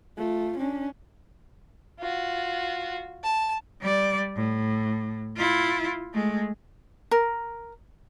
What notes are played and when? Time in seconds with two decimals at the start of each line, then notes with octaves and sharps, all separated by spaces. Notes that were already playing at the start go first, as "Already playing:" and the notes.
0.18 A3 F4
0.58 C#4 D4
1.99 F4 F#4
3.23 A5
3.81 G3 D5
4.36 A2
5.37 E4 F4
6.14 G#3 A3
7.11 A#4